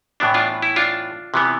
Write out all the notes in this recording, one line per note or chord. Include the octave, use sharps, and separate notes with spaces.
A2 E3 B3 D4
D4 F4
E4
D4 F4
C3 E3 B3